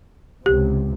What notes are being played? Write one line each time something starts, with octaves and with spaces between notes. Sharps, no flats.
C#2 C3 G4